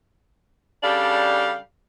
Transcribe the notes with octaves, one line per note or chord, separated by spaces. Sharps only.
C#3 G3 D4 G4 A4 F5